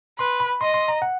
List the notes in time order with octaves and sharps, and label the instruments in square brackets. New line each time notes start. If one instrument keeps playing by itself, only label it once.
[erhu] B4 [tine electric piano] C6
[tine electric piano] B5
[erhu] D#5 [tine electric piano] C6
[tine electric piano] C6
A#5
F#5